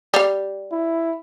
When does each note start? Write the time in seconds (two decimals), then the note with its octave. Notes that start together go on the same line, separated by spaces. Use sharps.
0.14 G3 F5
0.72 E4